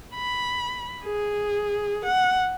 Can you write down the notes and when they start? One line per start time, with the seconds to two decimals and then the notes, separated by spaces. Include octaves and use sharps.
0.15 B5
1.03 G#4
2.05 F#5